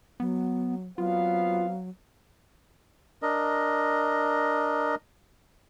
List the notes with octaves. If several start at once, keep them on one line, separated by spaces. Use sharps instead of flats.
F#3 B3
F#3 B3 C4 F4 F5
D4 A#4 D#5